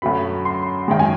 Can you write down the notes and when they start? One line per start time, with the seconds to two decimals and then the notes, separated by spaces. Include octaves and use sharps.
0.02 F#2 D3 F#3 A3 B5
0.45 C6
0.88 F#2 D#3 G#3 G5
0.99 G#5